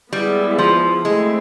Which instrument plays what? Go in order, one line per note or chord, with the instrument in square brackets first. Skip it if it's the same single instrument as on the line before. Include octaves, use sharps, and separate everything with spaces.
[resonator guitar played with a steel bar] G3 [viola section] G#3 B3 E4
[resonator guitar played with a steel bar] F3
[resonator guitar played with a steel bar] G#3 [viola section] A3 C4 E4